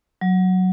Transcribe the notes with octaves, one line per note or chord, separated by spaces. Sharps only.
F#3